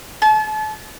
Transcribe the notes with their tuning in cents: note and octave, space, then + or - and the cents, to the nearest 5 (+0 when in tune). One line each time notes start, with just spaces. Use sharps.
A5 -35